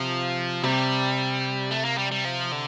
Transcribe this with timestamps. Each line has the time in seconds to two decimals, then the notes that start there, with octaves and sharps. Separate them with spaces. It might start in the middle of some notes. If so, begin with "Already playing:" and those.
Already playing: C3 F3
0.63 C3 G3
1.71 A3
1.85 A#3
1.98 G3
2.12 G3
2.25 F3
2.52 D3